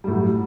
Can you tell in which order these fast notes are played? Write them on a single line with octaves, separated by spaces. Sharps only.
G3 A2 F#3